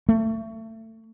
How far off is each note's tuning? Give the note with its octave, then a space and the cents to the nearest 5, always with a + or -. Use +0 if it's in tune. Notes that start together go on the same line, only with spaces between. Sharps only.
A3 +25